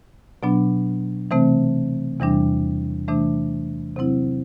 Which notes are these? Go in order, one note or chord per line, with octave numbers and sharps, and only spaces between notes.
B2 F#3 B3 D4
C3 E3 A3 C4
E2 C3 E3 G3 D4
C3 E3 A3 D4
C3 F#3 C4 E4